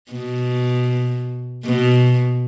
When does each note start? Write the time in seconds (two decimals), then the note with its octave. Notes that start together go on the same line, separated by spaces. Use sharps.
0.12 B2
1.65 B2